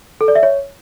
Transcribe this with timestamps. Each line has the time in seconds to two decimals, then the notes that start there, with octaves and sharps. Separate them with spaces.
0.21 A4
0.28 D5
0.35 E5
0.43 C#5